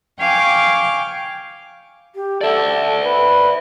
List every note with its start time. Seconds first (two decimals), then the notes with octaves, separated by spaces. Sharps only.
0.19 F5 G5 G#5 C#6 D6
2.15 G4
2.41 A4 D5 E5
3.02 B4